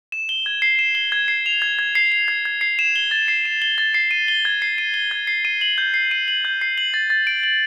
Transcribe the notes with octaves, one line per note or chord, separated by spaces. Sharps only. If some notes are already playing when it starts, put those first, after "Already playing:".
E7
G7
G#6
C7
E7
G7
G#6
C7
F7
G#6
G#6
C7
F7
G#6
G#6
C7
E7
G7
A6
C7
E7
G7
A6
C7
D#7
G7
G#6
C7
D#7
G7
G#6
C7
D#7
F#7
G6
C7
D#7
F#7
G6
C7
F#7
A6
A6
D7
F#7